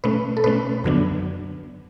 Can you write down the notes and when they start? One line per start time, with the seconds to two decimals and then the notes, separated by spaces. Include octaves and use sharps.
0.04 B2 A3 C#4 B4
0.37 A4
0.44 B2 A3 C#4 B4
0.84 F#2 D3 F#3 B3 D4